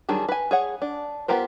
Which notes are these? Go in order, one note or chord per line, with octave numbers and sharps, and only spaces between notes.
D#3 F#3 G3 D4 G#4
B4 G#5
G#4 C#5 F#5
D4
B3 F4 G4 A#4 C5